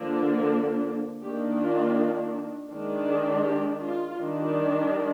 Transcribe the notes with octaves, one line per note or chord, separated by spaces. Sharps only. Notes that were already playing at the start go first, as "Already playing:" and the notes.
Already playing: D3 F3 A#3 D4
D#3 A#3 D4 G4
F4
D#3 G#3 D4
G#4
G4
F4
D#3 G3 D4